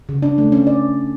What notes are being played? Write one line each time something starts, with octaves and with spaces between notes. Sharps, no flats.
C#3
D4
A3
C#4
D5